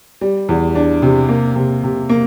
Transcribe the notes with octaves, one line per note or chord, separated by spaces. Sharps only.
G3
E2
D4
C3
A#3
C3
C3
A#3